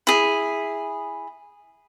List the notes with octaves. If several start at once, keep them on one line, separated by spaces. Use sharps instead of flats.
E4 G#4